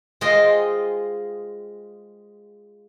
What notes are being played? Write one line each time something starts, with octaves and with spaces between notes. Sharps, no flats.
G#3 F4 G#4 C5 D#5 G5